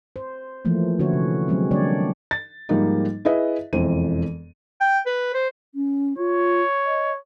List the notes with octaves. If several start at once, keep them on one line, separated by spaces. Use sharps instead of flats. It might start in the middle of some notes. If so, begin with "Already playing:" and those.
C5
E3 F3 A3 A#3
D3 C#4 E4 F#4 C#5
C3
F#3 G#3 C4 C#4
D3 G3 A#3 D4 C#5 D5
A6
G#2 F3 G3 A#3 D#4
E4 G#4 B4 D#5 E5
E1 F2 E3 C5 D#7
G5
B4
C5
C#4
F4 C#5
D#5